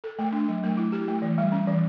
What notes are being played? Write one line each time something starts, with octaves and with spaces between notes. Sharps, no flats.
A4
A3
D4
F#3
A3
E4
G4
A3
E3
G3
C#4
E3